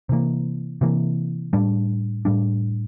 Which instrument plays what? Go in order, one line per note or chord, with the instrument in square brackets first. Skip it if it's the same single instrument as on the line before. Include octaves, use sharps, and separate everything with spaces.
[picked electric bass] C3 E3 A#3
C3 E3 A#3
A2 G3 D4
A2 G3 D4